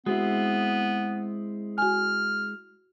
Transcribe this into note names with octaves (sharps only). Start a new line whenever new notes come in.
G#3 B3 C4 E4 F#4
F#4 G#5 F6